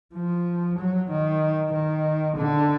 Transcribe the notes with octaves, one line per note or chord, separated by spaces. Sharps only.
F3
F#3
D#3
D#3
D3